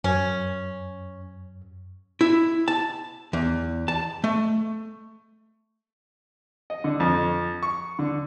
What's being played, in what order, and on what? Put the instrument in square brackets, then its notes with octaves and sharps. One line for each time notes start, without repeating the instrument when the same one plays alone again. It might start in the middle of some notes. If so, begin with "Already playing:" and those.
[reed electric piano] F#2 [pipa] C#4
[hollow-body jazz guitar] E4
A5
E2
A5
A3
[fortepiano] D#5
D3
F2
C#6
D3